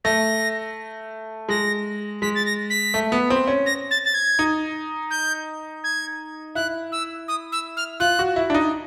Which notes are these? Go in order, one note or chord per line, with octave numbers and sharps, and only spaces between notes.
A3 A#6
G#3 A#6
G#3 B6
A6
A#6
B6
A3
B3
C4
C#4
A#6
A6
A6
G#6
D#4
G6
G#6
E4 F#6
E6
D#6
E6
F6
F4 F#6
F#4
E4
D4
D#4